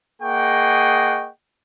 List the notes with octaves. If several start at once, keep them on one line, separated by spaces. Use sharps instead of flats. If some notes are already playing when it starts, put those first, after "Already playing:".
A#3 G#4 D#5 F#5 G5 C#6